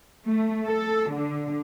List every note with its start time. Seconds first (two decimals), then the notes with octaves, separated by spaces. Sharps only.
0.25 A3
0.66 A4
1.13 D3